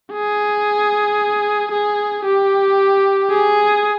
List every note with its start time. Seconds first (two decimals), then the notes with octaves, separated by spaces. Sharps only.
0.12 G#4
1.71 G#4
2.25 G4
3.31 G#4